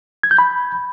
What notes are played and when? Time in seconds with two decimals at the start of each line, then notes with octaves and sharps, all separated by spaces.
0.23 G#6
0.31 G6
0.38 B5